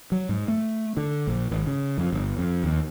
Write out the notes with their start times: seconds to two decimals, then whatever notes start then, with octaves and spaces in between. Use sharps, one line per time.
0.12 F#3
0.29 G#2
0.48 A3
0.97 D3
1.27 A#1
1.51 G#1
1.67 C#3
1.98 F2
2.13 G1
2.38 F2
2.64 D#2